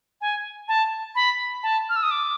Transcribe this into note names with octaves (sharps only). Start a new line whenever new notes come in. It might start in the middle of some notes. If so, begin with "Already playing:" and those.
G#5
A5
B5
A5
F6
E6
D#6
D6